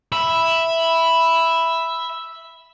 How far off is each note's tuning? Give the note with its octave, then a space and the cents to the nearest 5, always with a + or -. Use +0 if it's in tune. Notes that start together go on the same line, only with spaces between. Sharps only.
E5 +0 B5 +0